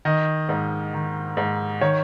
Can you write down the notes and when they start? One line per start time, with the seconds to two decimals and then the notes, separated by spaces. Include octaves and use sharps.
0.05 D#3 D#5
0.49 G#2
0.94 D#3
1.37 G#2
1.81 D#3 C#5